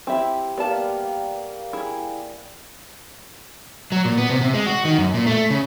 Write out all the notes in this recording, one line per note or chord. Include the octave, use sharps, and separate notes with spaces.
C4 E4 G4 E5
G3 A#3 B3 F5 A5
E4 G#4
F#3
A#2
B3
C3
C3
G#3
F#4
D#3
F#2
A#2
A3
C#3